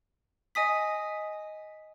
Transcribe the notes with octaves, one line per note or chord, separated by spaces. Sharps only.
D#5 G#5 D#6 B6